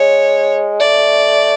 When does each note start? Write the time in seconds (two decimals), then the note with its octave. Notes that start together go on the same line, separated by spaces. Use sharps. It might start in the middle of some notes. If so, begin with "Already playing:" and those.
Already playing: G#3 C#5
0.80 A3 D5